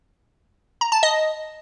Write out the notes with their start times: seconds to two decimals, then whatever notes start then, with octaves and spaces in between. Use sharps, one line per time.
0.81 A#5
0.92 A5
1.03 D#5